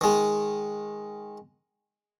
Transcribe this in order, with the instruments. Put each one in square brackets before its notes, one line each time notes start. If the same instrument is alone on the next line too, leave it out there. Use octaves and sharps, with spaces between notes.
[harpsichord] D#3 G#3